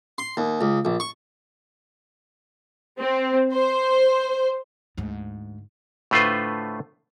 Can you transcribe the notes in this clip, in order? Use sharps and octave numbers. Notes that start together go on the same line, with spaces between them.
C6
D#2
C#2
A#1
C#6
C4
C5
D2 G#2
A2 D3 A3 F4 B4 C5